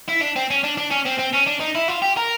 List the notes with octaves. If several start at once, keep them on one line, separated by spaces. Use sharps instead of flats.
E4
D4
C4
C#4
D4
D4
C#4
C4
C4
C#4
D4
D#4
E4
F4
G4
A#4